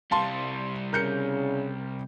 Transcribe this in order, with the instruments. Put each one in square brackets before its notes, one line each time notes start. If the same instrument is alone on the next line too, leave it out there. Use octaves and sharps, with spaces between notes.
[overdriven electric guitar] C2 G3 [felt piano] F5 A5 C6
[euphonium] C#3 [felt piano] A#4 G6 C#7